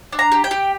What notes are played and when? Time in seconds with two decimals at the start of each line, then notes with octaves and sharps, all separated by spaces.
0.12 D4
0.19 A#5
0.32 G4
0.44 G5
0.51 G4